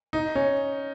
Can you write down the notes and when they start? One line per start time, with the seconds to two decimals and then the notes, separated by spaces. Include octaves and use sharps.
0.13 D#4
0.35 C#4